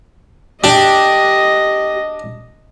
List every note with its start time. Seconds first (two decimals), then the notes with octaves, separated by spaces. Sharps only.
0.64 D4 G4 D#5